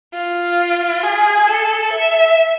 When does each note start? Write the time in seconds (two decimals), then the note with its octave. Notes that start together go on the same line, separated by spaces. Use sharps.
0.14 F4
1.03 G#4
1.48 A4
1.93 E5